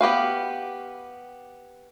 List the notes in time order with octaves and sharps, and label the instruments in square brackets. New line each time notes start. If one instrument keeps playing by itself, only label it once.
[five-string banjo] B3 G4 B4 F5